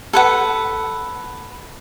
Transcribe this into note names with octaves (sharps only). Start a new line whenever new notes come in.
A4 B4 F#5